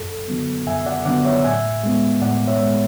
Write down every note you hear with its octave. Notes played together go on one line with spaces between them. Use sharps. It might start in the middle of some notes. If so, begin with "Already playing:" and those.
Already playing: F#2 A4
D3 F#3 B3
F#2 E5 G#5
D5 F#5
D3 F#3 B3 D5 F#5
C#5 E5
A2 E5 G#5
G#3 B3
A2 D5 F#5
C#5 E5
G#3 B3